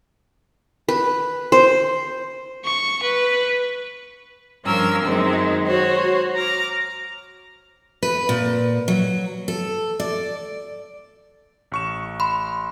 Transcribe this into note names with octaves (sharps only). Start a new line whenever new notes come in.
B4
C5
C#6
B4
G2 F3 C#4 A#4 E6
F#2 D#3 G#3 C4 D#4
F#4 C5 C#5
A#5 D6 F6
B4
A#2
F#3
A4
D5
A1 C#6 E7
B5 C6